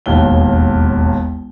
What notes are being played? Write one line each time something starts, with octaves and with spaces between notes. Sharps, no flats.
E1 A1 D#2 G7